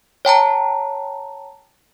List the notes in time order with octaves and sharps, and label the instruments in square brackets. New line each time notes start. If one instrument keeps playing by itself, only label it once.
[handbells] C#5 G5 A5 A#5